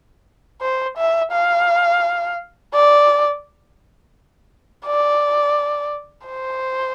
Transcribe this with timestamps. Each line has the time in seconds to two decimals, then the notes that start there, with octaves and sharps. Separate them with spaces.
0.62 C5
0.97 E5
1.32 F5
2.74 D5
4.86 D5
6.26 C5